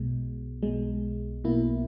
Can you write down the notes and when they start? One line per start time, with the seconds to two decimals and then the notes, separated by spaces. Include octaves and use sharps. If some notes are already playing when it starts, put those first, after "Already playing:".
Already playing: B1 B2 G#3
0.62 B1 B2 G#3
1.44 B1 B2 A#3 E4